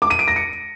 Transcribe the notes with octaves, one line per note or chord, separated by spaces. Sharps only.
D6
D#7
D7
A#6
C#7